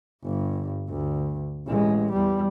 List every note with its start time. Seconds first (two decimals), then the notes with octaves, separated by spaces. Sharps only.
0.23 G1 G2
0.89 D2
1.67 A1 G#3
2.13 E2 G3